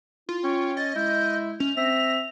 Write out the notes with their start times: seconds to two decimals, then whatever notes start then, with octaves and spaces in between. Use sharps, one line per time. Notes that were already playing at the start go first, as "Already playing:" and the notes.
0.29 E4 F4
0.44 C#4 G5 C#6
0.77 D#5 A6
0.95 G#3 E4 G6
1.60 C#4 F7
1.77 C4 E5 A#6